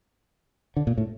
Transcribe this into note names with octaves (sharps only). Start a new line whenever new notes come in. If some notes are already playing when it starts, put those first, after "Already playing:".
D3
A#2
A2